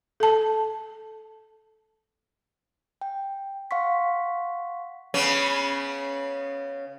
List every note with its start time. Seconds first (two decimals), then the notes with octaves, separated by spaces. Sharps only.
0.20 A4 A5
3.01 G5
3.71 F5 F#5 C6 C#6 B6
5.14 C#3 B3 C#4